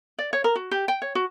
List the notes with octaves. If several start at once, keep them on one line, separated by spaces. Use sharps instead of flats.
D5
C#5
A#4
F#4
G4
G5
C#5
F#4